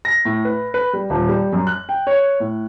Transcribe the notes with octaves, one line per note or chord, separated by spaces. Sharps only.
A#6
A2
B4
B4
G3
D#1
G3
F#2
F#6
G5
C#5
A2